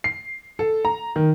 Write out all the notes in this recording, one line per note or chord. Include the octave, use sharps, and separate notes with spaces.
C7
A4
A#5
D#3